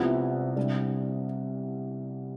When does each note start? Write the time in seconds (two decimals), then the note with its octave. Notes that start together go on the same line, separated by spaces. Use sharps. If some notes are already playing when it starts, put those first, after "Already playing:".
Already playing: C2 C3 F3 B3
0.56 C3 G3 D4